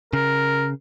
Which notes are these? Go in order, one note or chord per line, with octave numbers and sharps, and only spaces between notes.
C#3 A#4